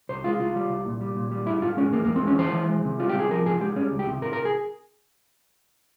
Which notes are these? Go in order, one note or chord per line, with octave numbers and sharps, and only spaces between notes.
C2 C5
G#3 F4
C2 F4
G3
C2
A#2
G3
A#2
G3
G#2 E4
G#2 F4
G#3 C#4
E2 A#3
A#3
E2
C4
G#3 C#4
E3 C5
E3
G#3
C3
G3 F4
G4
C3 G#4
F3 A#4
G#2 G#4
G#3 G4
G3 C#4
C#2
G4
C3
G#2 A#4
A#4
G#4